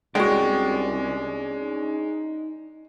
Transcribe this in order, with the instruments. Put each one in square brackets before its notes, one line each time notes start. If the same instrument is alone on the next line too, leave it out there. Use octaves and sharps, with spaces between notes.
[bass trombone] C2 [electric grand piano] G#3 [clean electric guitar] C#4 D4 [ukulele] F#4 G5
[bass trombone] D#4